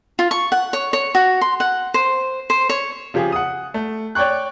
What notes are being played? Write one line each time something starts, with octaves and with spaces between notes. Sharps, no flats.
F4
C#6
F#5
C#5
C#5
F#4
C6
F#5
C5
C5
C#5
C#3 F3 G4 G#4
F#5 D#6
A3
C#5 D5 G5 C#6 F#6